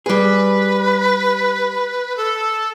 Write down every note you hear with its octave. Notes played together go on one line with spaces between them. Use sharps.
G3 G#4 B4
A4